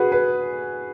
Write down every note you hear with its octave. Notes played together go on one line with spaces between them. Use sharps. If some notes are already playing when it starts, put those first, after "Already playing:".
Already playing: F#4 G#4 B4
B4